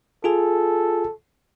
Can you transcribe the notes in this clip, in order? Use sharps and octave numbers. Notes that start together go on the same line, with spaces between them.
F4 G#4 A4 G#5